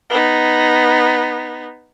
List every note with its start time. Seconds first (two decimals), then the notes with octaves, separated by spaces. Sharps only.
0.10 B3 D#4